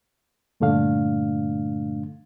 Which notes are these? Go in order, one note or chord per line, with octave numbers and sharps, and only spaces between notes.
G2 A#2 D3 A3 D4 F5